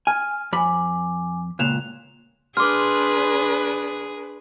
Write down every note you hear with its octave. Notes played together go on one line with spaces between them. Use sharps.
G#5 F6
F2 G#5 B5 D6
C#2 A#2 F#6 E7 F7
D4 G#4 B4 C6 D6 F6